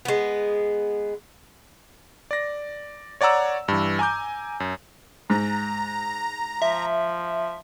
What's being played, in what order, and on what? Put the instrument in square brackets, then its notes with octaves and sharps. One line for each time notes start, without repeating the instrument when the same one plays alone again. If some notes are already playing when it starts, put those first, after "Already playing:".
[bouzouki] G#3 B3
[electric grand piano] D5 A#6
C#5 D5 F#5 A#5 E6
G2 E3
G#5 A#5 D6 G6
F#2
[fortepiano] G#2 [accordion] A#5
[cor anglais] F3 [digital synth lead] E5